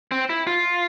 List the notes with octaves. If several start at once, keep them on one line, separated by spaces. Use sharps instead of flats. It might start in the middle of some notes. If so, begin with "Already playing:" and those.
C4
E4
F4